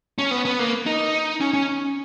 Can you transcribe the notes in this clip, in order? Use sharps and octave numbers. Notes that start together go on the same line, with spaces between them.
C#4
B3
B3
A#3
D#4
C#4
C#4